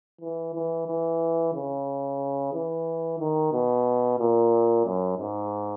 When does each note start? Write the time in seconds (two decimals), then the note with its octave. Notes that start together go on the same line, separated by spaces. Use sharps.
0.21 E3
0.55 E3
0.87 E3
1.54 C#3
2.53 E3
3.20 D#3
3.53 B2
4.19 A#2
4.85 F#2
5.18 G#2